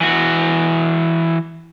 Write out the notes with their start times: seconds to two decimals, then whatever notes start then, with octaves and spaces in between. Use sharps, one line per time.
0.01 E3 F#4